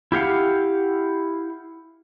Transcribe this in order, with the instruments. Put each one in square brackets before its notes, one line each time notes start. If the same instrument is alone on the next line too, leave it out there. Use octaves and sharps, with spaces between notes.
[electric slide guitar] E4 G4 F5 F#5